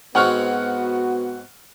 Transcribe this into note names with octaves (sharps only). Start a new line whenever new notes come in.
G#2 G#3 B3 C4 F#4 F#5 C#6 F6